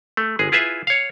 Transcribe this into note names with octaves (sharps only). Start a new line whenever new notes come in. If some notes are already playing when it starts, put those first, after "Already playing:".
A3
G1 G#3 G#4
E4 F4 G#4 B4 E5
C#5 F5